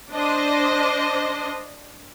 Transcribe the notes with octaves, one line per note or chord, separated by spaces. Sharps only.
D4 C5 D#5